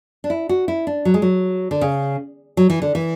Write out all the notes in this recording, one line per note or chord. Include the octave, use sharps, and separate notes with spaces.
D4
E4
F#4
E4
D4
F#3
G#3
F#3
D3
C#3
F#3
E3
D3
E3